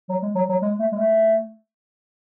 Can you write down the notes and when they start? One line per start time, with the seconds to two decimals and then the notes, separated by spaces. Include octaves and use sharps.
0.09 F#3
0.23 G#3
0.35 F#3
0.49 F#3
0.62 G#3
0.80 A3
0.92 G#3
0.98 A3